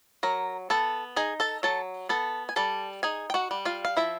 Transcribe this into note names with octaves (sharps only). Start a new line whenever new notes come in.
F#3 A#4 A#5
B3 A4 A5
D#4 G#4 G#5
A4 A5
F#3 A4 A5
B3 A4 A5
G#5
G3 A4 A5
D#4 G#4 G#5
G5
F#4 F#5
G3
F4 F5
F5
F3 E4 E5